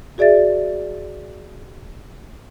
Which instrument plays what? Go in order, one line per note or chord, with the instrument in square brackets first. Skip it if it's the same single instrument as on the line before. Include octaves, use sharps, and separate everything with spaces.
[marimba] F#4 G#4 D5 E5 A6